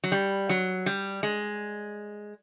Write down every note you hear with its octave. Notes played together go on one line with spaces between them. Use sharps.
F#3
G3
F#3
G3
G#3